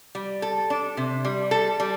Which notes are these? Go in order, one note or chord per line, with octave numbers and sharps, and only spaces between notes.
G3
A4
D4
C3
G3
A4
G3